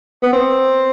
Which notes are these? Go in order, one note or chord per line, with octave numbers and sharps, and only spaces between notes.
B3
C4